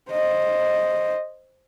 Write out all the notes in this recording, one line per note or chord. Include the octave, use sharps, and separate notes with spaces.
C5 D#5